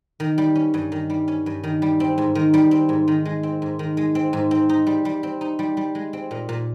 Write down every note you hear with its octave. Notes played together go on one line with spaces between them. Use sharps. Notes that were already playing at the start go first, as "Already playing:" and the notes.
D#3
G3
C#4
G2
D#3
G3
C#4
G2
D#3
G3
C4
G#2
D#3
G3
C4
G#2
D#3
G#3
C4
G#2
D#3
G#3
C4
G#2
C4
D#4
G3
G3
C4
D#4
G3
G3
G#3
C4
A#2
A#2